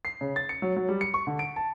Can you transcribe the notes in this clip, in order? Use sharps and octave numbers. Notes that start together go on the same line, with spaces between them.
C7
C#3
A6
C#7
F#3
F#3
G3
C#7
C#6
D3
D7
A5